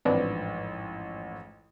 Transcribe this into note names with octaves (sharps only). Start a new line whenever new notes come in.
A1 F2 G#2 C4 D4 B4